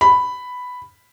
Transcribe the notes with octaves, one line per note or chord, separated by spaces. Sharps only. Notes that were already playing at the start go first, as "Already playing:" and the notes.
B5